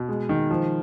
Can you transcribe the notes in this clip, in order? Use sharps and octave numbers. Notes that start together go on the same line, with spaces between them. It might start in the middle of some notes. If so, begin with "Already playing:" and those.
Already playing: B2
G#3
D#3
F3